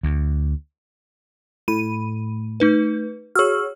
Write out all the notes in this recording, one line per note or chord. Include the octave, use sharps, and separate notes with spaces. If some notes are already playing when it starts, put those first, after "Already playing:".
D2
A2 B5 D#7
A3 D#4 B4
F#4 G#4 C#5 E6 F6